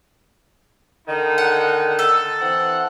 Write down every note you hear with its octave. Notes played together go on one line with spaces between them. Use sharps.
D3 D#3 D#4
F#5
A4
E3 C4 F#5